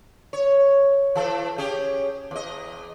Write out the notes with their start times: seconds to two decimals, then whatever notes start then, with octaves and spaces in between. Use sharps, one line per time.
0.33 C#5
1.15 E3 A4
1.58 C#4 G4 G#4
2.31 E2 D#5